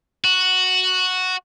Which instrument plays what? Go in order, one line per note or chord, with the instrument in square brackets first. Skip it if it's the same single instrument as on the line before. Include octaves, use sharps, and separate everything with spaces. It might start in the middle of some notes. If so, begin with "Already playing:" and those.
[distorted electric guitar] F#4